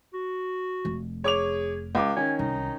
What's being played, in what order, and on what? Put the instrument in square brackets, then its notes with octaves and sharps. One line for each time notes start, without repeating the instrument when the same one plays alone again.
[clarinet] F#4
[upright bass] F1
[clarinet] G#4 [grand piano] C#5 D6 F7
[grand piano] C#2 D6
[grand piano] D#3 C#4 [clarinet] G#5
[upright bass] C2 [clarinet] D#4